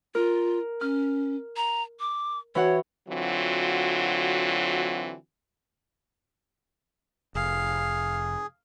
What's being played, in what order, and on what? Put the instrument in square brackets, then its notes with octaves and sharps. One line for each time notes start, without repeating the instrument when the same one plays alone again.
[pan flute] F4 [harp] A#4
[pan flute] C#4 [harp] F6
[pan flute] A#5
D6
[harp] E3 F#4 F#5 [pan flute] C#5
[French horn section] D3 E3 F#3 C4 F4 F#4
[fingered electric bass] F1 [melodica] G#4 [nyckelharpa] F5